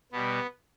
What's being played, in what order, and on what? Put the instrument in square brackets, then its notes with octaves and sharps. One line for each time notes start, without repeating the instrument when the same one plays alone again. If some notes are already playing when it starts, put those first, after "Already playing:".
[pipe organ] B2 G3 B3